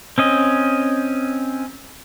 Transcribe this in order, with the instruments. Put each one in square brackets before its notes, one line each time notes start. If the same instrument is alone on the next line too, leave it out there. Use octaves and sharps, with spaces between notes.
[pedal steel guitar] C4 C#4 D#5